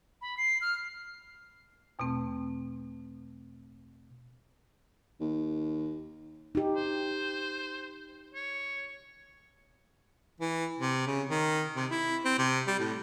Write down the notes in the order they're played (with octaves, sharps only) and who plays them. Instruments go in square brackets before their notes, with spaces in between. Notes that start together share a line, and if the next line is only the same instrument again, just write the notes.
[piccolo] B5
C7
F6
[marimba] E2 B2 A3 C4
[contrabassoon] D#2
[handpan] D#4 G4
[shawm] C5
C#5
[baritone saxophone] E3
C3
C#3
D#3
C3
E4
C4
C3
G3
A2